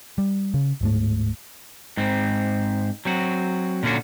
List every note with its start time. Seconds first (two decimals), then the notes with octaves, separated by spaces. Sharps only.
0.18 G3
0.54 C#3
0.81 D1 G#2 A3
1.97 G#2 C4
3.05 F#3 C4 F#4
3.83 A#2 D3 C#4 D4 F#4